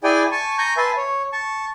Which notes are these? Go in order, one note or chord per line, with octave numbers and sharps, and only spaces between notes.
E4 G#4 D5 G5 G#5
G#5 A5 C#6
G#5 A#5 C#6 G6
B4 E5 G#5 A5 C6
C#5
A5 C#6